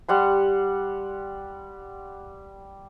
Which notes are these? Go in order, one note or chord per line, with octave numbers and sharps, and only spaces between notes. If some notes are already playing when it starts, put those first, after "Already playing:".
G3 F#5 C6